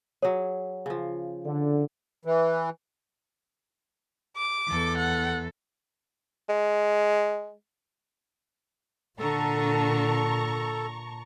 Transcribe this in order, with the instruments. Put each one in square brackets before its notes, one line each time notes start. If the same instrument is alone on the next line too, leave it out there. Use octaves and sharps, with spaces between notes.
[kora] F#3 G#4 [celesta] C#5
[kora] C#3 F3
[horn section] D3
[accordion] E3
[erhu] D6
[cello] E2 A4
[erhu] F#5
[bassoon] G#3
[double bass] A#2 [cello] D3 [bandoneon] A4 [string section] A5 A#5 C#6